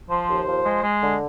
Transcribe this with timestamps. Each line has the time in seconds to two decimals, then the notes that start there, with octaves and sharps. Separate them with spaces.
0.09 F3 C5
0.27 D#2
0.46 F3
0.64 G#3
0.83 G#3
1.01 D3